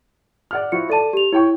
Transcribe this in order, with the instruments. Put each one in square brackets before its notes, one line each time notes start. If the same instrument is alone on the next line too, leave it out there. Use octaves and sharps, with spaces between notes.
[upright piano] D5 F#5 F6
[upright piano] F3 E4 F#4 [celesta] C#7
[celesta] A4 D#7 [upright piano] D5 A5
[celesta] G4 F7
[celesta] E4 [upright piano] C#5 G5 C#6